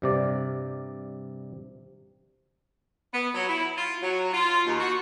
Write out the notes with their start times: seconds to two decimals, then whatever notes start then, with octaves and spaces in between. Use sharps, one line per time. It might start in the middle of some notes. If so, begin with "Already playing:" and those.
0.02 G2 C3 D5
3.13 B3
3.34 F#3
3.48 E4
3.76 F4
4.02 F#3
4.33 F4
4.67 D#2
4.80 F#4